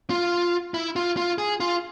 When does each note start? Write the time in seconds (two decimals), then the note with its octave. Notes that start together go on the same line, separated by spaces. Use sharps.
0.10 F4
0.74 E4
0.96 F4
1.17 F4
1.38 G#4
1.60 F4